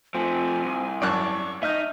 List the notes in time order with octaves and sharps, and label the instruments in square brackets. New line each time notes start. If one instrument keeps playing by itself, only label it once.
[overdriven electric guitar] F3 A3 [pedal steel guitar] C4 [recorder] G#5
[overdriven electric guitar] C2
[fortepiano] G#1 F#2 F#6 [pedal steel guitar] D5 A5 [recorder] C#6
[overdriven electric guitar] D#4 [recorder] D#5 [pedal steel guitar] E5 F6 G6